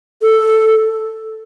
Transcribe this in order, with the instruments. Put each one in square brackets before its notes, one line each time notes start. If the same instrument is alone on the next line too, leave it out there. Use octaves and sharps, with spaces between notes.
[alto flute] A4